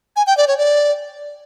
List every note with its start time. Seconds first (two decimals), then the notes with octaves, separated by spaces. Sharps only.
0.16 G#5
0.27 G5
0.37 D5
0.48 C#5
0.58 D5